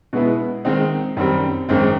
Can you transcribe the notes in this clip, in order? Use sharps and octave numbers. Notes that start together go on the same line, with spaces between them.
B2 G#3 B3 E4
D#3 G#3 C4 D#4
F#2 D#3 G3 C4
G#1 F#2 D#3 G#3 C4